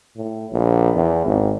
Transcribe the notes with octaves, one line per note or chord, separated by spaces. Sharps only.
A2
A#1
E2
G#1